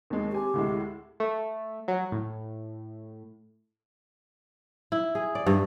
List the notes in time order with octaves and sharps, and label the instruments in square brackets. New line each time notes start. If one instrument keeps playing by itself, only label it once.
[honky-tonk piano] D#2 G#3
[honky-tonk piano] C4 G#5 [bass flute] G4
[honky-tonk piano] D2 A2 G#3
[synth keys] A3
F#3
A2
[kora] E4
G#4
D5
G2